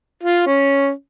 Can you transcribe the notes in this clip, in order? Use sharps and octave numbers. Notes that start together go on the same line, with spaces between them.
F4
C#4